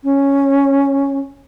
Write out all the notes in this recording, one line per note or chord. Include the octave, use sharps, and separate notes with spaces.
C#4